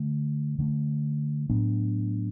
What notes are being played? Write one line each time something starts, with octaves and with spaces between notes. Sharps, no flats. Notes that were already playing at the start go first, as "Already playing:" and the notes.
Already playing: D3 A3
D3 A3 C#4
A2 F#3 B3 D4